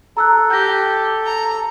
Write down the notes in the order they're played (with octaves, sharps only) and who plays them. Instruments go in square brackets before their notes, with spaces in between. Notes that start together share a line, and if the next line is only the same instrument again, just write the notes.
[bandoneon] A4 [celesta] A#5 E6 F#6
[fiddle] G4 [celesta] G6 A#6
[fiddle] A#5